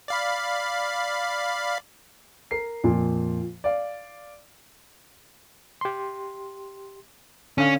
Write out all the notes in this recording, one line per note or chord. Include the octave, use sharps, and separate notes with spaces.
D5 F5 B5
A#4 C7
F2 A#2
D5 F5
G4 C6
D3 C#4 F5